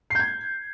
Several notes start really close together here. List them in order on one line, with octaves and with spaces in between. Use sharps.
C7 G6 G#6